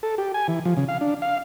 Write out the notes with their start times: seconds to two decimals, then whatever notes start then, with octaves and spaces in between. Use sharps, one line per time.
0.03 A4
0.18 G4
0.34 G#5
0.48 E3
0.65 F3
0.77 C#3
0.88 F5
1.01 D4
1.22 F5